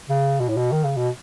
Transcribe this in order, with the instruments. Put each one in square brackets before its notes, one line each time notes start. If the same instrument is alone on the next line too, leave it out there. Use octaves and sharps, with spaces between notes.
[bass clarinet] C#3
B2
A2
B2
D#3
C#3
B2